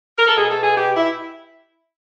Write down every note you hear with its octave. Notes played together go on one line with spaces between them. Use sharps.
A#4
A4
B2 G#4
A4
G#4
G4
E4